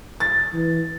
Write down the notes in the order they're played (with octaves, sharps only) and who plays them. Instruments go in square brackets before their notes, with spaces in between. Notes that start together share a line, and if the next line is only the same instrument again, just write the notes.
[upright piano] A6
[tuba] E3